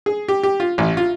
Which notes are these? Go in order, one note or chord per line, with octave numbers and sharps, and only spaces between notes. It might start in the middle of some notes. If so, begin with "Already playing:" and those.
G#4
G4
G4
F4
A1
F4